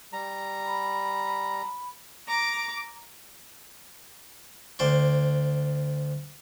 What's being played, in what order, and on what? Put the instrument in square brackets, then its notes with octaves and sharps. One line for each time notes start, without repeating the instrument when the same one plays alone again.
[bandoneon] G3 A#5
[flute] B5
[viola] A#5 D6
[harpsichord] D2 C5 D5